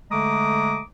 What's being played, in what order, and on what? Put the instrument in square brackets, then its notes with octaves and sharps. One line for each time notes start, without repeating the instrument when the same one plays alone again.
[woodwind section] D3 G#3 A3 A#5 D6 D#6